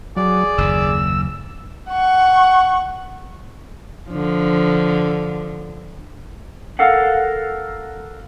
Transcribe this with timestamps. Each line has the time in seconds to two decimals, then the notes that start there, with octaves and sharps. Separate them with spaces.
0.16 F#3 G#4 D5
0.58 F#1 D#2 E6
1.90 F#5 C#6
4.09 D3 F3
6.79 A4 A#4 F5 F#5